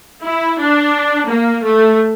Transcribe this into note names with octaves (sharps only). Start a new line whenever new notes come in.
E4
D4
A#3
A3